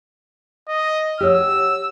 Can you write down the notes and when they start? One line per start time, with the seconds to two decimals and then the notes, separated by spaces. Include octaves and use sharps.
0.68 D#5
1.20 G4 C#5 F#5 E6